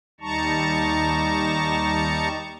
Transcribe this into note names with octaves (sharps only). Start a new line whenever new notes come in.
D#2 G3 D#4 A5 A#5 C#6